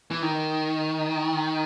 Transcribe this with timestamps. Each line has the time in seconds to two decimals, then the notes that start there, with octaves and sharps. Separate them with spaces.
0.11 E3
0.22 D#3